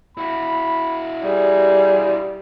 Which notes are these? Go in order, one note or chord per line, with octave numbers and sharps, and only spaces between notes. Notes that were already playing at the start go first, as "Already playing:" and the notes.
E4 F#4 B5
G3 G#4